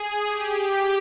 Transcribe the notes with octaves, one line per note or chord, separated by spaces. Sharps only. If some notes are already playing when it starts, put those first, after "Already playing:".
Already playing: G#4
G4